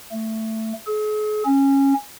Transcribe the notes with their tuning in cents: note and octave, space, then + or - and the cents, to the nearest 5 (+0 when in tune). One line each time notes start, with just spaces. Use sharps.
A3 +10
G#4 +45
C#4 -15